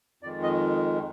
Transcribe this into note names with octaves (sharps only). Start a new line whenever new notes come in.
F2 D#3 G#3 D5
D#5